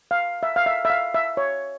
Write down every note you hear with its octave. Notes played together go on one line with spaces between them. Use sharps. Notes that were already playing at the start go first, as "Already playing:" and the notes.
F5
E5
F5
E5
E5
F5
E5
C#5